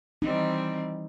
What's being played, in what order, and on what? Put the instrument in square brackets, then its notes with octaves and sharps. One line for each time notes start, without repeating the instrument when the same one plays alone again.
[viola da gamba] E3 G3 C4 [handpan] D#4